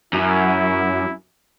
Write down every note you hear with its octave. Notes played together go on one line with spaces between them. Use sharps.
F#2 E4